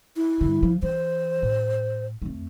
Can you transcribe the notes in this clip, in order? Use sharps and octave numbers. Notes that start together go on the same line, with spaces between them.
E4
G2 D3
F3
E3 C5
A2
F2 A3